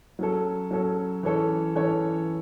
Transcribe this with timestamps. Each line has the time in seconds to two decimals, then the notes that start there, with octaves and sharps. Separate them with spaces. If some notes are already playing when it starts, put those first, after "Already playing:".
0.19 F#3 C#4 A4
0.71 F#3 C#4 A4
1.23 E3 C#4 A4 C#5
1.75 E3 C#4 A4 C#5